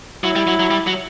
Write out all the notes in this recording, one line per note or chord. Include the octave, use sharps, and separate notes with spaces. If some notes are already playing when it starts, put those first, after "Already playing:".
F#3 E4
G3
F#3
F#3
G3
F#3